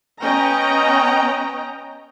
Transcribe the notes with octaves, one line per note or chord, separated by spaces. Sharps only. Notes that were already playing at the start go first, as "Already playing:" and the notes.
B3 C#4 D#5 G5 A#5